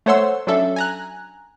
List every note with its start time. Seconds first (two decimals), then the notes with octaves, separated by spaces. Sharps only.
0.06 A3 C5 C#5 F#5 C6 E6
0.47 F#3 C#4 D4 A4 E5
0.76 G#5 A#5 F#6